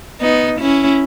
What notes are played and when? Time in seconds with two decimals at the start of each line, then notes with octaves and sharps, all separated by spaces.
0.20 B3 D#4
0.59 C#4 E4